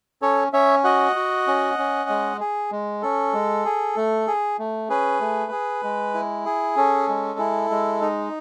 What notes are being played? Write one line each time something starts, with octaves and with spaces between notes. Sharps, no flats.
C#4 A4 C#5
C#4 C#5 E5
F#4 D#5 F#5
F#4
C#4
C#4
G#3
G#4
G#3
C#4 A4
G#3
G#4
A3
G#4
A3
C#4 G#4 B4
A3
G#4
G#3
E4
G#4
C#4 A4
G#3
E4
G#3
D#4